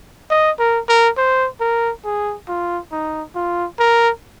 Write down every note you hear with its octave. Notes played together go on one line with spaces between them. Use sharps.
D#5
A#4
A#4
C5
A#4
G#4
F4
D#4
F4
A#4